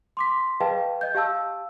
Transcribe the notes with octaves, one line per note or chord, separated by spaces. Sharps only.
C6 D6 B6
G#4 B4 D#5 F5 G5 A5
D#5 G6
G4 F5 A5 E6